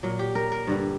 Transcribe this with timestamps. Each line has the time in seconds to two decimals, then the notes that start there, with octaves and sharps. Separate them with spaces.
0.03 A#2 F#3
0.19 G4
0.35 A#4
0.52 A#4
0.67 G2 D3 G3